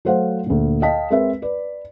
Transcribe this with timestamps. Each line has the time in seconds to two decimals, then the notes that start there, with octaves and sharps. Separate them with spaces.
0.05 F#3 A3 C5 F5 F#5
0.46 D2 A#2
0.82 D#5 F5 G5 A5 B6
1.10 G#3 C4 A#4 B4 E5
1.42 B4 D5